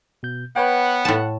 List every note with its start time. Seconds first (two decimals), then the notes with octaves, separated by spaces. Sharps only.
0.23 B2 G6
0.56 B3 B4 C#5 F#5 G5
1.05 A2 A5